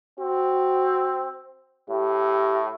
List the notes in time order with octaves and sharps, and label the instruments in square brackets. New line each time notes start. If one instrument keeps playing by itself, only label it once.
[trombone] C4 [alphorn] F#4
[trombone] A2 [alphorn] G4